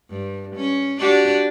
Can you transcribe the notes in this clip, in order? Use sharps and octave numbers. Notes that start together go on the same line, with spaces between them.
G2
C#4
D4 F#4 G4